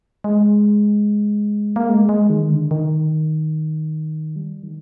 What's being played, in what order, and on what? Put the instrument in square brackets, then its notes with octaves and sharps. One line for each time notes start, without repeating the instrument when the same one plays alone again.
[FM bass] G#3
A#3
G#3
G#3
D#3
D3
D#3
G3
D#3